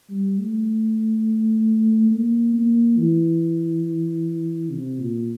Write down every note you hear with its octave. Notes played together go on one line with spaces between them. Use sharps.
G3
A3
A#3
A#3
E3
C3
A#2